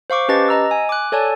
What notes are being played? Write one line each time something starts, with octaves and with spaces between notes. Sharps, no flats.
C5 F5 C#6 D6
C#4 G4 B4 D#5 A5 A6
D#5 A#5 E6
G#5
D6 F#6
A4 C#5 D5 G#5 A5